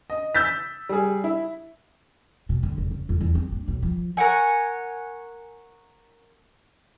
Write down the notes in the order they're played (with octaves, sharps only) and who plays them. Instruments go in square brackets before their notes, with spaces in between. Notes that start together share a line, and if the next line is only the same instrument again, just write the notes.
[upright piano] D#5
E6 G6 A6 B6
G3 G#4
E4
[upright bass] B2
D3
F1
C#3
F2
E2
C4
D4
B1
F3
[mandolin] A#4 C#5 F#5 G#5